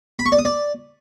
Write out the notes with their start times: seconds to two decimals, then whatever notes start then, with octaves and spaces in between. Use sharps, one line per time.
0.19 B5
0.26 C#6
0.32 D5
0.39 D#6
0.45 D5